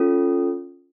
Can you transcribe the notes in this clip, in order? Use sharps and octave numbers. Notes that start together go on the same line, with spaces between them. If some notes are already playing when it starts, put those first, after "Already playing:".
Already playing: C#4 F4 A4